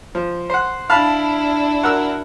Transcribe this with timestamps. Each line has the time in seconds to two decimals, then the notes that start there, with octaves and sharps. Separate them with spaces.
0.15 F3
0.50 C5 F#5
0.90 D4 E4 F5 A5 B5
1.83 F#4 A#4 E6